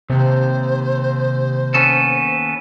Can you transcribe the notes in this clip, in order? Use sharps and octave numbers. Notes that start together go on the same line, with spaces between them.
D#2 C3 C5
B3 C#4 A4